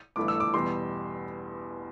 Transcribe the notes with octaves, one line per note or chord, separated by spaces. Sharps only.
G1 G2 E3 A3 D6
E6
D6
E2 B2 G3 C6